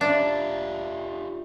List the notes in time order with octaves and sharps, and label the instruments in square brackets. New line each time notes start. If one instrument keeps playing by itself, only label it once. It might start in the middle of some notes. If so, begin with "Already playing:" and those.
[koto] D4 [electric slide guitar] F4 G4 E5